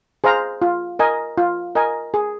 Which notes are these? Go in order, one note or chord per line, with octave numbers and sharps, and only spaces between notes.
G#4 C5 F5 A#5
F4
A#4 D#5 G#5
F4
A#4 D#5 G#5
G#4